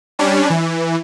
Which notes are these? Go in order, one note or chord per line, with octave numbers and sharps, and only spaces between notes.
G3 C#4 D4
E3